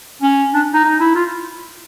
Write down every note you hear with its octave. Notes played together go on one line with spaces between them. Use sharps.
C#4
D4
D#4
D#4
E4
F4